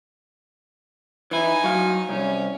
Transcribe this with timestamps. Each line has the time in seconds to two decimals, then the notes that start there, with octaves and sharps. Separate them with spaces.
1.31 E3 D#4 E4 G#5
1.64 F#3 F5
2.09 C2 C#4